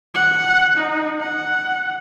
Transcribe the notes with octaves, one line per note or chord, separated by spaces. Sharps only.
F#5
D#4
F#5